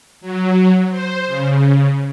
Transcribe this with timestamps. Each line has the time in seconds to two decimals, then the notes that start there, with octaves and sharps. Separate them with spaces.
0.21 F#3
0.90 C5
1.27 C#3